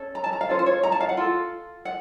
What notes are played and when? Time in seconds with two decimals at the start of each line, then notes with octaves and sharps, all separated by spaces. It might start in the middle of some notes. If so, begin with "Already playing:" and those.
Already playing: C#4 A4
0.15 A#5
0.24 A5
0.33 A#5
0.41 F5
0.49 C#4 F4 A4 C5
0.59 C5
0.66 C#5
0.83 A#5
0.92 A5
1.01 F5
1.09 F#5
1.17 F4 A4
1.85 F#5